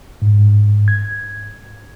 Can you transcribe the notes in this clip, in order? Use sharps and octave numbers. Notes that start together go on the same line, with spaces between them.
G#2
G#6